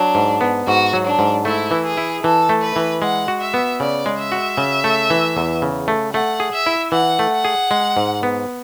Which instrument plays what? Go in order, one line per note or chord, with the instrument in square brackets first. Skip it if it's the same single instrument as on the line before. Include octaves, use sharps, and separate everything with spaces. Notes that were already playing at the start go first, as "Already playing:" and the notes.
Already playing: [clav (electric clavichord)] F#3 [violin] D4
[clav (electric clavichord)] G#2
B3
[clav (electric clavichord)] G#2 [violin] F#4
[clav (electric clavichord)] F#3
[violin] D4
[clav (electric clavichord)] G#2
[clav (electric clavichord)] A3 [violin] E4
[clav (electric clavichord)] E3
[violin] G#4
[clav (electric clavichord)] E4
[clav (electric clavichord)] E3 [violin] A4
[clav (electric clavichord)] A3
[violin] B4
[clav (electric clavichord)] E3
[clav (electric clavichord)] G#3 [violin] F#5
[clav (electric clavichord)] F#4
[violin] E5
[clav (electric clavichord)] B3
[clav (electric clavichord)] C#3 [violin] D5
[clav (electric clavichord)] G#3
[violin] E5
[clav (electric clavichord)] F#4
C#3
A3
E3
E2
C#3
A3
[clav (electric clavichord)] A3 [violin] F#5
[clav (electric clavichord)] G#4
[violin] E5
[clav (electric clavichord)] E4
[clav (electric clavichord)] E3 [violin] F#5
[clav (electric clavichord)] A3
[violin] F#5
[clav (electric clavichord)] G#4
G#3
G#2
B3